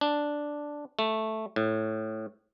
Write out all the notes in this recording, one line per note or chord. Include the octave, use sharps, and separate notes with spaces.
D4
A3
A2